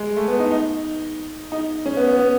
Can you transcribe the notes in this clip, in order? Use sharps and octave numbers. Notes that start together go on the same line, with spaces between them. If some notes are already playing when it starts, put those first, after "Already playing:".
Already playing: G#3
A3
B3
D#4
D#4
D#4
C#4
B3
B3
B3